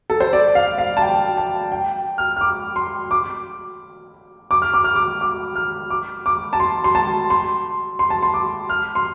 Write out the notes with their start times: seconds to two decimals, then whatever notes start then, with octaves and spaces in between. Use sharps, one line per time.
0.10 A4
0.20 C5
0.33 D5
0.55 F5
0.78 F5
0.97 A5
1.02 G5
1.37 A5
1.72 G5
2.18 F6
2.37 F6
2.41 D6
2.76 C6
3.11 D6
4.51 D6
4.62 F6
4.74 D6
4.84 F6
4.96 D6
5.21 D6
5.56 F6
5.90 D6
6.26 D6
6.53 A5
6.60 C6
6.84 C6
6.95 A5
7.30 C6
7.99 C6
8.10 A5
8.23 C6
8.34 D6
8.70 F6
8.95 C6